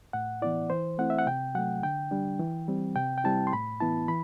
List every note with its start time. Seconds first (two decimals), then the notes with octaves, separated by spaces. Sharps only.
0.13 A2 F#5
0.42 E3 B3 E4 D5
0.70 E3 C5
0.98 A3 C4 E4 F#5
1.10 E5
1.19 F#5
1.26 C3 G5
1.55 F#3 A3 F#5
1.83 D3 G5
2.11 G3 D4
2.39 E3
2.68 G3 C4
2.95 C3 G5
3.18 G5
3.24 G3 C4 E4 A5
3.47 C6
3.53 A2 B5
3.80 E3 B3 E4 A5
4.08 E3 B5